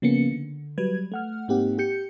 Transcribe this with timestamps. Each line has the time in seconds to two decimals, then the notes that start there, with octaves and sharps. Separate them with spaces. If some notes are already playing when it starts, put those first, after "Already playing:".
0.02 C#3 F3 A#3 B3 C#4 C#7
0.31 D3
0.78 F#3 G3 B4 G#6
1.12 A3 F#5 F6
1.48 G#2 A#3 C4 D#4 G4 F#5
1.78 G4 G6 C#7